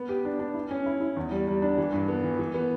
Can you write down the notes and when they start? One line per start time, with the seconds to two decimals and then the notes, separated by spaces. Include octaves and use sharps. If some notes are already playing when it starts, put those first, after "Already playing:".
Already playing: B3
0.09 G4
0.25 D4
0.39 D4
0.55 E4
0.71 C#4
0.86 E4
1.01 E4
1.17 E2
1.31 G3
1.47 G3
1.62 D4
1.78 E3
1.93 G2
2.08 B3
2.24 E3
2.39 E3
2.54 B3